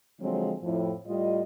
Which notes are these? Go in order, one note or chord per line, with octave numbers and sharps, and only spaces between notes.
D3 F3 F#3 G#3 C4
F2 A2
A2 G3 F4 D#5